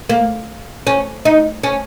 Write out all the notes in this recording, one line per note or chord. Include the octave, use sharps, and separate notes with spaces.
A#3
C#4
D#4
C#4